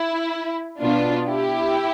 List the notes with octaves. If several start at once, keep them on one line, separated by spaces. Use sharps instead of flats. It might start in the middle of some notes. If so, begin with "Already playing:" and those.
Already playing: E4
B2 B3 D4 F4
E4 G4